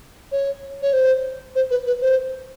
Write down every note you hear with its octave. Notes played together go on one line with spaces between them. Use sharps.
C#5
C#5
C5
C5
B4
B4
C5